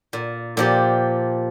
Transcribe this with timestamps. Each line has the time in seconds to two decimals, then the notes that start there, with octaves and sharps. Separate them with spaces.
0.13 A#2
0.57 A#2 F3 G4